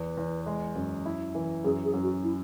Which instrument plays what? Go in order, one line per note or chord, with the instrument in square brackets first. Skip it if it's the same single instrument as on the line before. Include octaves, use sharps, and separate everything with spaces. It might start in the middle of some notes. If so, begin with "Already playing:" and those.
Already playing: [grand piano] E2 [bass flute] B4
[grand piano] E2
G#3
F#2
E4
E3
[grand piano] F#2 [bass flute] G#4
[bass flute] G#4
[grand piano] F#2
[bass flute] F#4
E4